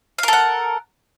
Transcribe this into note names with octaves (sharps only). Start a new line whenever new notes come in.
A4 A#4 F5 F#5